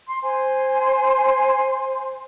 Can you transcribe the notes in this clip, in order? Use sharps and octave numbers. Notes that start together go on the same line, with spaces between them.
C6
C5 G#5 C6